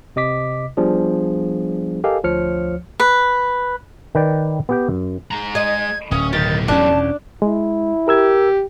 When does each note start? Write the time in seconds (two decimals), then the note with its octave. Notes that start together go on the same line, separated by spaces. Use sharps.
0.16 C3 D#5 D6 B6
0.77 F3 G3 B3 D4 G#4
2.04 G4 A4 A#4 D#5 F5 G#5
2.24 D2 F3 C#5 F6 C#7
3.00 B4
4.15 D#3 B4 D5 G5
4.69 B3 G4 G5
4.88 F#2
5.31 G#3 A#5
5.55 D#5 G#6
6.11 D1 C#4 D#6
6.33 B1 D#3 G4 A6
6.68 E1 E2 C#4 D4 A5
7.42 G#3 E4
8.08 G4 A#4 E6 G#6